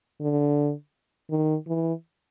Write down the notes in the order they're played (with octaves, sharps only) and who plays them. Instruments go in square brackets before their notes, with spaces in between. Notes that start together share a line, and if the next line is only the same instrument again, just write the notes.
[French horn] D3
D#3
E3